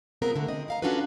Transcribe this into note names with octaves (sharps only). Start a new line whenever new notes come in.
C3 B3 C4 F4 G#4 A#4
D3 A3
C4 D#5
E4 F5 A#5
C#4 D4 F4 F#4 A4 B4